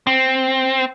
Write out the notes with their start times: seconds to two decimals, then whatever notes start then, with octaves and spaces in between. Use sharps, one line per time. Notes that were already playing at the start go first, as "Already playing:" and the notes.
0.07 C4